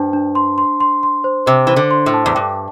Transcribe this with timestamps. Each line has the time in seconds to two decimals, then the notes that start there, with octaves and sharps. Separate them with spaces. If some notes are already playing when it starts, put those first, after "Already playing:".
Already playing: G2 D4 C5 A5
0.13 D4
0.35 C6
0.58 C6
0.80 C6
1.03 C6
1.24 C5
1.46 C3 C5
1.67 E3 C5
1.76 D3
1.91 C6
2.06 A2
2.14 A5
2.26 E2
2.35 G2 G5